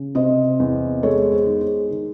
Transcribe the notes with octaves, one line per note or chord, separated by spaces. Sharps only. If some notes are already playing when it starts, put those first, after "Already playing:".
Already playing: C#3
C3 C5 D#5
E2
G#3 A4 C#5
G#4 C5
D#3
G#4
D#3